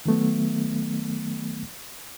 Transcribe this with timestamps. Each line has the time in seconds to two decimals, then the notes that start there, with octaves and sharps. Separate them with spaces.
0.06 D#3 F#3 A3 B3